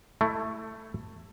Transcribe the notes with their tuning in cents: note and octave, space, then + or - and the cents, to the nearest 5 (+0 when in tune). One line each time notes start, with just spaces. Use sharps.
A3 +10 E4 +0